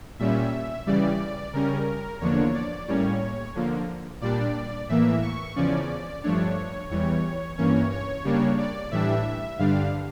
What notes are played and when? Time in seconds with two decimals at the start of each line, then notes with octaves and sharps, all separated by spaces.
0.19 A#2 G3 C#4 E5
0.87 C#3 E3 G3 D5
1.53 C#3 G3 C#4 A#4
2.20 E2 D3 F3 A#3 D4 C#5
2.54 D5
2.88 A2 G3 A#3 C#4 C#5
3.55 D3 F3 A#3
4.21 A#2 G3 D4 D5
4.89 A2 E3 A#3 E5
5.22 C#6
5.56 E2 C#3 F3 C#4 D5
6.23 G2 F3 A3 D4 C#5
6.90 E2 E3 G3 C#5
7.58 G2 E3 A#3 C#4 C#5
7.91 C#5
8.24 C#3 G3 A#3 D4
8.58 D5
8.91 A2 E3 G3 D4 E5
9.58 G2 D3 G3 D4 F5